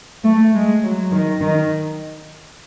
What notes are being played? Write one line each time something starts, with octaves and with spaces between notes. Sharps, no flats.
A3
G#3
F#3
D#3
D#3